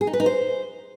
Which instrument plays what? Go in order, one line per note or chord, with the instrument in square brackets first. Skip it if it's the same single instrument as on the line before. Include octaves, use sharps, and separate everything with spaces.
[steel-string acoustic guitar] G#4
D#4
B4
D#4
C5